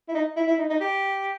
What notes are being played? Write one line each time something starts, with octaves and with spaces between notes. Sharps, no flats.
E4
D#4
E4
E4
D#4
D#4
G4